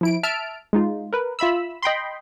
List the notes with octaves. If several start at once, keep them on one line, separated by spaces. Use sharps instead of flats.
F3 E4 D7
E5 A5 F6 D7
G#3 D#4 F4
A#4 B4
F4 E5 B5 E6
D#5 G5 B5 C6